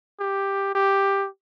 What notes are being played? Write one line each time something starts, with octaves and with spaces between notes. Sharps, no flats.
G4
G4